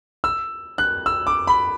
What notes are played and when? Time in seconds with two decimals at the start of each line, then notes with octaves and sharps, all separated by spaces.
0.24 E6
0.78 F#6
1.06 E6
1.27 D6
1.47 B5